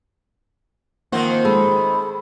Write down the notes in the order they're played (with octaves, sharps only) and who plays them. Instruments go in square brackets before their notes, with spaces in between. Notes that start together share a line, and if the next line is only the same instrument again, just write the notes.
[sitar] D#3 C4 C5 [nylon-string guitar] F3 F#5 [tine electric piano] A#3
[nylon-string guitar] G#3 [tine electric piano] A4 [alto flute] B5